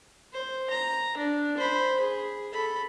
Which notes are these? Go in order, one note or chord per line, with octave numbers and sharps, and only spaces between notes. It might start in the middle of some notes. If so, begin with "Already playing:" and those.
C5
A#5
D4
C5 B5
G#4
A4 B5